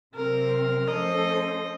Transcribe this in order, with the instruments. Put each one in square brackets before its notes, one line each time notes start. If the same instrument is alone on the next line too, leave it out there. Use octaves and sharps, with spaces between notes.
[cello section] C3 F#3 C4 [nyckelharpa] A#4
[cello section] F3 A3 C#4 A4 C5 [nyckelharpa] D#5